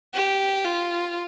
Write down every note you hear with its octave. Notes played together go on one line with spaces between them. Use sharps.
G4
F4